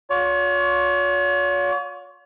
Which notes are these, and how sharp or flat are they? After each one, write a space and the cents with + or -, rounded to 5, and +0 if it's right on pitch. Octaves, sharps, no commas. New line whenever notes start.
F4 +40 C#5 +40